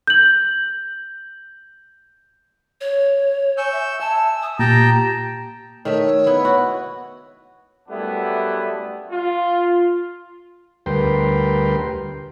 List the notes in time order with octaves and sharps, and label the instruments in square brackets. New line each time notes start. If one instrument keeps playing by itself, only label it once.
[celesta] G6 F#7
[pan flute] C#5
[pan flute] G#5 [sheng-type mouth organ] C#6 E6 G6
[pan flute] E5
[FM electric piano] E5 G#5 [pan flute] A5 [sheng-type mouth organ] E6
[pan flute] D#6
[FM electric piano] A#2 [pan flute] G4 [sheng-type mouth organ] G5 A5 A#5
[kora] D#3 A3 E5 [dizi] C#5
[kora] B3 E4
F#4
[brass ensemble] F#2 G3 A3 B3 D4 E4
F4
[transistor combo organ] D2 G3 A#4 B4 G5 C6